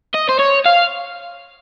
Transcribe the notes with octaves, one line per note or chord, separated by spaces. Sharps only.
D#5
C5
C#5
F5